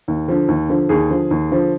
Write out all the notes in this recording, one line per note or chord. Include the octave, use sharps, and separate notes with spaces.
D#2
D3 F3
D#2
D3 F3
D#2 G#4
D3 F3
D#2
D3 F3